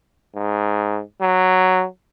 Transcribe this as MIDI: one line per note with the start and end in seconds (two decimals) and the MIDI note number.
0.35 1.00 44
1.21 1.85 54